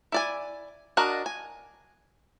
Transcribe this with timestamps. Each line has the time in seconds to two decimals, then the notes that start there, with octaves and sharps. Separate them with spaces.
0.12 E4 D5 G#5
0.97 D4 F#4 A#4 D#5
1.26 G#5